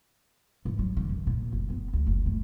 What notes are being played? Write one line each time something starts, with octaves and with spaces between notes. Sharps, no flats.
G#2
F#3
D3
F#2
A#2
F#1
B3
D2
F#1
A2